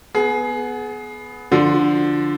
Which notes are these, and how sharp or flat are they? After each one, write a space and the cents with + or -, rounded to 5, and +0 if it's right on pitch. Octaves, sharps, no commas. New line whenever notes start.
B3 +0 G#4 +25
D3 +0 F3 +0